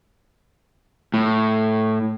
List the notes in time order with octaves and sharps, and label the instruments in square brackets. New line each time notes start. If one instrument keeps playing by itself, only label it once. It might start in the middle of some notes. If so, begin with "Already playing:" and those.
[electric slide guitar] A2